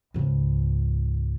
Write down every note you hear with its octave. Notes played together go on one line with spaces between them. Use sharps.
C#2 G#2